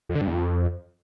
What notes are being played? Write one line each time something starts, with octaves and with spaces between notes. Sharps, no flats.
F2
D3
G2
E2
F2